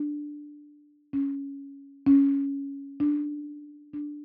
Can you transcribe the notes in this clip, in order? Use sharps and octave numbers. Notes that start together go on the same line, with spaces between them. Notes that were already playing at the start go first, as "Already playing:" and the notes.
Already playing: D4
C#4
C#4
D4
D4